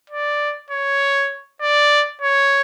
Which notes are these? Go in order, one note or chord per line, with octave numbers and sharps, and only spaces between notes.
D5
C#5
D5
C#5